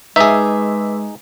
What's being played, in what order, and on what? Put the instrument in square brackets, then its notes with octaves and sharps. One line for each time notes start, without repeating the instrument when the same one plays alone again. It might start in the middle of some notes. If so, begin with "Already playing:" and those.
[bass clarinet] G#3 [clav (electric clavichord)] D#4 G#4 [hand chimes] B4 D6 E6 [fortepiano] E5